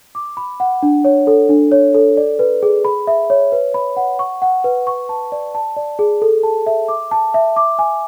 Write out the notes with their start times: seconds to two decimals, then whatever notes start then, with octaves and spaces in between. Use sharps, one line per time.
0.15 D6
0.37 B5
0.60 F#5
0.83 D4
1.04 C#5
1.27 A4
1.49 D4
1.72 C#5
1.94 A4
2.17 D5
2.39 B4
2.63 G#4
2.85 B5
3.07 E5
3.30 C#5
3.52 B4
3.74 B5
3.97 F#5
4.19 C#6
4.42 F#5
4.64 B4
4.87 C#6
5.09 A5
5.32 D5
5.55 A5
5.77 D5
5.99 G#4
6.22 A4
6.43 A5
6.67 E5
6.88 D6
7.11 A5
7.34 E5
7.56 D6
7.79 G#5